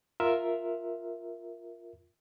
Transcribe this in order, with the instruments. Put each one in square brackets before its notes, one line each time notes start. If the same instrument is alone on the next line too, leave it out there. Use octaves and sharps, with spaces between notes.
[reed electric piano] F4 A#4 E5